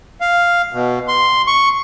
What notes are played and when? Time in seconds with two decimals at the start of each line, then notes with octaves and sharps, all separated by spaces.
0.21 F5
0.73 B2
1.08 C6
1.47 C#6